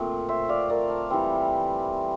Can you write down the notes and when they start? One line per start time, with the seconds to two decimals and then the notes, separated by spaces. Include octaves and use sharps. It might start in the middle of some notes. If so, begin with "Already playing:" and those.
Already playing: A#2 A3 C4
0.28 C5 E5
0.49 D5 F5
0.70 A#4 D5
0.90 F5 A5
1.10 E3 G3 C4